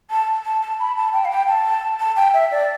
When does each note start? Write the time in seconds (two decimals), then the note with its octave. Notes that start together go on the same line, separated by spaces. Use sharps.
0.11 A5
0.45 A5
0.62 A5
0.80 B5
0.97 A5
1.13 G5
1.25 F5
1.31 G5
1.48 A5
2.00 A5
2.16 G5
2.34 E5
2.51 D5